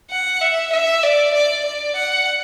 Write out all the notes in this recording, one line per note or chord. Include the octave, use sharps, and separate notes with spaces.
F#5
E5
E5
D5
D5
D5
F#5